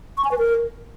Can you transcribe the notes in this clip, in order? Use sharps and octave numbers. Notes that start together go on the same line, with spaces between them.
C#6
G#5
B4
A#4